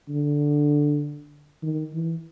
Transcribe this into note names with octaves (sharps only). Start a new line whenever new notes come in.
D3
D#3
E3